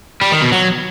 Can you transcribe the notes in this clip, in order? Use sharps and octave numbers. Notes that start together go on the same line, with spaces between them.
G3
D#3
B2
F#3